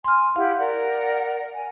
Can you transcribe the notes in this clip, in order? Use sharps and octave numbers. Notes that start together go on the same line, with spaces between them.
G#5 C6 F6
E4 G4 F5 F#5
A#4 D5 F#5
G#5